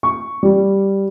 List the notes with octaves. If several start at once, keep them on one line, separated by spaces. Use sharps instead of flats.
C#6
G3